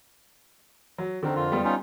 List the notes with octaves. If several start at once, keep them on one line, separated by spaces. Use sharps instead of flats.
F#3
D3 D#3 C4 A#4
F2 F4
G3 B3
C#4 D#4 F4